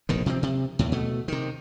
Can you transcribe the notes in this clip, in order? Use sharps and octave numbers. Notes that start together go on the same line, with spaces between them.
F1 A#1 B2 D#3
C3 F3 G3 C4
C3
D#2 A2
B2 A3
C3 D#3